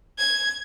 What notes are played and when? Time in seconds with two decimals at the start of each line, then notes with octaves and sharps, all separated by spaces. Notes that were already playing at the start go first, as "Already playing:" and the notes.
0.18 G#6